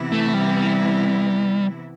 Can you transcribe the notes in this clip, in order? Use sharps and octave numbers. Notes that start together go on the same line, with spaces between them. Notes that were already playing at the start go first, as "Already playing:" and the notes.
Already playing: C3 E3 B3 E4
A3
G3